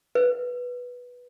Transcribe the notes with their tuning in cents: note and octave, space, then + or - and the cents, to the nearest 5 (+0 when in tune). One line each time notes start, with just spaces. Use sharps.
B4 -5